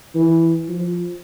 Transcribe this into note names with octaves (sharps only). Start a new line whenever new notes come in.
E3
F3